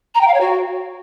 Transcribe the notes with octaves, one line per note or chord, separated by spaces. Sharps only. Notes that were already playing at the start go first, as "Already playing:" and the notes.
A#5
G5
F5
C#5
F#4